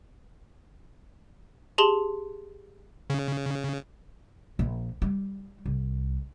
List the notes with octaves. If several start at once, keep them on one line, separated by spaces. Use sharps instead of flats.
G4 G#4 A5 C6 F#7
C#3
A#1
G3
C2